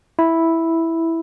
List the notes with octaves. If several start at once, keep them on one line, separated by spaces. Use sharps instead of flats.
E4